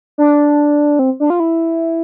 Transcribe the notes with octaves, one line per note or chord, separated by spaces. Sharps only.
D4
C4
D4
F4
E4